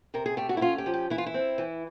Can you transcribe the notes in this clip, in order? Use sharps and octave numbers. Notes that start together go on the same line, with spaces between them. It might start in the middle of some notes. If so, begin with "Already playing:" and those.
C3 A#4
G#4
A3 G4
F#4
E4
C#4 F4
G4
F3
G4
E3 E4
F4
E4
C4
E3